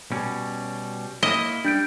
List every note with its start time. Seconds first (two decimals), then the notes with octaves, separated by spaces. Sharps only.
0.12 B2 G3 C#4
1.23 A#3 E4 D#5
1.65 G3 D4 G6 D7